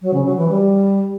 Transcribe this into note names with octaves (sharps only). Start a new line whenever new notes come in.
F#3
C#3
F#3
E3
G3